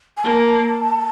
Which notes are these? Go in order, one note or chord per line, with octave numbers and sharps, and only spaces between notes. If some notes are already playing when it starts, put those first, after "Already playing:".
G#5
A#3 A5